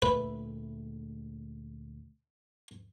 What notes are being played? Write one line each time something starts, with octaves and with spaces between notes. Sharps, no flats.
D2 A#2 A3 B4